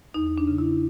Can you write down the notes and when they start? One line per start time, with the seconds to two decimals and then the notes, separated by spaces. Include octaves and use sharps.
0.14 E2 D#4
0.38 D4
0.47 C#3
0.58 E4